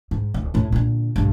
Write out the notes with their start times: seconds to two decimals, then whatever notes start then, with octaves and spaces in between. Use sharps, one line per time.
0.11 G#2
0.34 D1
0.54 D#2 A2
0.72 A#2 D3
1.16 B1 G2